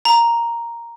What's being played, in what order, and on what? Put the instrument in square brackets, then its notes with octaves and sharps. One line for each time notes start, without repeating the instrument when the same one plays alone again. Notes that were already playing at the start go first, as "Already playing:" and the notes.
[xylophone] A#5